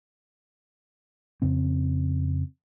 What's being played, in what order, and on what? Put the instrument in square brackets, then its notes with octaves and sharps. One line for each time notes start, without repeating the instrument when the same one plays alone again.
[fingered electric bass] F2 C#3 C4